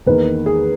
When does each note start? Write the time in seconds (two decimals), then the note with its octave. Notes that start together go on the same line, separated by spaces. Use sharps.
0.06 E2 D#3 A#3 B4
0.46 G#4